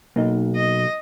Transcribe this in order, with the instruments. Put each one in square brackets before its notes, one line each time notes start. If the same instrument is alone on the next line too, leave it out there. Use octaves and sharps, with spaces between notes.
[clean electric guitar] B1 [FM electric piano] A#3 D#4
[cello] D#5